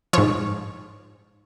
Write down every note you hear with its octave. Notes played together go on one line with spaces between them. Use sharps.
G#2 F3 C#5